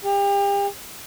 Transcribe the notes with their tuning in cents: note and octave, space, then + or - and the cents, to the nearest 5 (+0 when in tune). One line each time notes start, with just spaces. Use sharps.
G4 +35